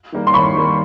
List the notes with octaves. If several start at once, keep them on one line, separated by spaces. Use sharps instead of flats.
D#3 G3 A#3
C6
D#2 B5 C#6
D#3 G3 A#3